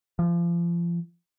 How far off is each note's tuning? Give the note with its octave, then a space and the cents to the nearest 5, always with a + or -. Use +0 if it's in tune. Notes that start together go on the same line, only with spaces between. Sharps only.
F3 -30